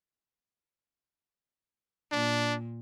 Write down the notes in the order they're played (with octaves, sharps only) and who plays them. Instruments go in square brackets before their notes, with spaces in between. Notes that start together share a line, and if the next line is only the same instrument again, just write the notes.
[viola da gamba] A#2 [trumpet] D4